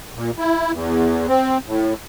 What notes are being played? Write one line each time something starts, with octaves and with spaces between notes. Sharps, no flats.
A#2
E4
E2
C4
A2